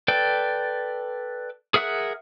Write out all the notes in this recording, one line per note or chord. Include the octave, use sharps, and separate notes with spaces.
A4 B4 D5 G5
G#4 A#4 E5 F#5 F#6